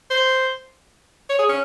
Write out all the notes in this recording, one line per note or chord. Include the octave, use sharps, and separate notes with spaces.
C5
C#5
G#4
C#4